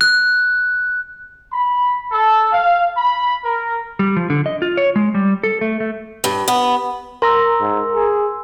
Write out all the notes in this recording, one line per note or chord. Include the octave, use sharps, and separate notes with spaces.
F#6
B5
A4
F5
B5
A#4
G3
F3
D3
D#5
F4
C#5
G#3
G3
A4
A3
A3
G2
B3
A#4 A#5 C6 E6
G#2
G#4